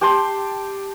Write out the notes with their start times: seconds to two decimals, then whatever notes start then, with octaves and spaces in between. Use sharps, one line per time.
0.01 G4 G5 A5 C6